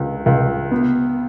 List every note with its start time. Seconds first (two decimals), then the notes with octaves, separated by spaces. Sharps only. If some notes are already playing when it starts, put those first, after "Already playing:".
Already playing: C#2
0.26 C#2
0.71 B3